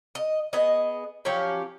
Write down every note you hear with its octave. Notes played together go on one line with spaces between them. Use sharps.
D#5
B3 G#4 D#5
F3 F#3 C#4 G4